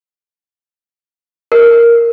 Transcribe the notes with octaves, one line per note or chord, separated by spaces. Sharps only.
A#4